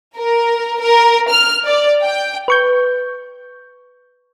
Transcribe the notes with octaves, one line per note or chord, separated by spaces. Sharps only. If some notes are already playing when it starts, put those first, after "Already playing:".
A#4
A#4
F6
D5
G5
B4 C#6 G6